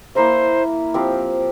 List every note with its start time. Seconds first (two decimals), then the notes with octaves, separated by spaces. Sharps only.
0.15 A#3 E4 A#4 C5 E5
0.94 F3 C4 G4